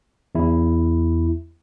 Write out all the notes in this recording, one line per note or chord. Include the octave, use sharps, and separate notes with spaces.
E2 E4